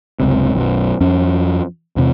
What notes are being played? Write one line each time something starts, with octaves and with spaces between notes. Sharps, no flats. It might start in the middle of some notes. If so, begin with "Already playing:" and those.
F#1 C#2 C3
B1 F#2
F2 C#4
E2 C3